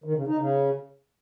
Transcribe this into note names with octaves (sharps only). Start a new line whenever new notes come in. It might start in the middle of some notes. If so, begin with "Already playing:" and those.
D#3
C#3
D#4
C#3